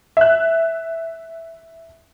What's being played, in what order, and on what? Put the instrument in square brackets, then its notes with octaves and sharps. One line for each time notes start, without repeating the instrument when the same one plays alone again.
[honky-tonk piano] E5 F#6